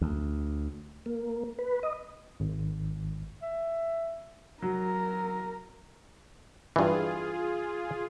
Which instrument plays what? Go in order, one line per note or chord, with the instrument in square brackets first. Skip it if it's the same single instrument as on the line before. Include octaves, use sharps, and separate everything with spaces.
[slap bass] D2
[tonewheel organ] A#3
B4
D#5
[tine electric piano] G#1
[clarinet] E5
[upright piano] F#3 [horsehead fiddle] A#4
[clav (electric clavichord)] G2 E3 [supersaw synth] F4 G#4